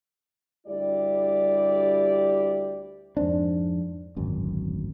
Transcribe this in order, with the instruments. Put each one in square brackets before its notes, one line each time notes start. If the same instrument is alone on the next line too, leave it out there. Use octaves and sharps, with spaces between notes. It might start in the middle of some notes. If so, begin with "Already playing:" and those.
[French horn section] D2 G3 E4 G4 D5
[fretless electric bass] F2 G#2 C4 D4
D1 G#1 F#2